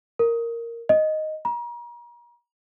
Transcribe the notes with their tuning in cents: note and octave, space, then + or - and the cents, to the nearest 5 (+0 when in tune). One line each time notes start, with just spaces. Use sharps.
A#4 -5
D#5 +0
A#5 +40